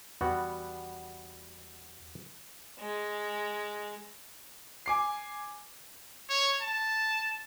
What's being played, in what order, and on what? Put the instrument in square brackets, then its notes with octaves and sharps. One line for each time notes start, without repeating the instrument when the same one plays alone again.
[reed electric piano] E2 [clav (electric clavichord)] G3 B3 F#4
[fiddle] G#3
[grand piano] G#5 D6 C7
[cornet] C#5
A5